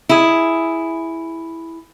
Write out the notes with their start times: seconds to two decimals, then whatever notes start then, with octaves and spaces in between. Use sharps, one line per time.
0.09 E4 G#4